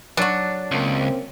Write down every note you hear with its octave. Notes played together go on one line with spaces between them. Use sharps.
F#3 D4 F#4
C#2 A#3 C4 C#4